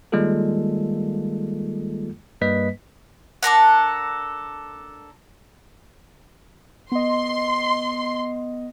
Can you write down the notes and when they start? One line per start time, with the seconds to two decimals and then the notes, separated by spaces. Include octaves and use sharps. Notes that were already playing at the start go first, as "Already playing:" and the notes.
0.12 D#3 G3 G#3 A#3 F4 A4
2.41 G2 G3 A#3 B4 D#5 B6
3.43 D4 A4 A#4 F#5
6.92 B3 D#5 C6